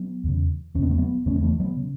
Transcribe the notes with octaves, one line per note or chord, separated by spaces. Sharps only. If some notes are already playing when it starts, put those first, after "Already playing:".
Already playing: F#3 B3
E2 C#3
E2 C#3 B3 C#4
A3
F#3 B3
E2 C#3 A3 C#4
B3
E3 A3
F#3 B3
C#3